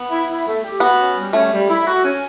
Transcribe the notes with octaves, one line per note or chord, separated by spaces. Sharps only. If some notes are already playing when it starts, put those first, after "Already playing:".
Already playing: B3
E4
E4
A3
G4
B3 F#4
C#4
G3
A3 C#4
G3
E4
F#4
C#4